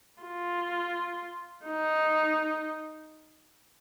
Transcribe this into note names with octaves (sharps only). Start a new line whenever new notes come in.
F4
D#4